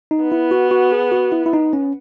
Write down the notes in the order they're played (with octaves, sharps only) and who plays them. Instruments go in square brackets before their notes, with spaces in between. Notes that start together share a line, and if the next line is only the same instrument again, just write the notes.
[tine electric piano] D#4
[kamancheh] B3
[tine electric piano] E4
F#4
F#4
G#4
F#4
E4
E4
D#4
C#4